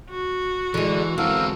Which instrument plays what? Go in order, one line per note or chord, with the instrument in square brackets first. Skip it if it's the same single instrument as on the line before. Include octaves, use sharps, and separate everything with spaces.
[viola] F#4
[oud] D3 G#3 [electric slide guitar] E3
[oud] E2 [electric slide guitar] D3 G#3 C4 [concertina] A4 A#4 F5